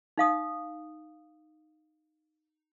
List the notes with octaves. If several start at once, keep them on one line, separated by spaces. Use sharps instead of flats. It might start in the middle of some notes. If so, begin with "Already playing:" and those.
D#4 F5 D#6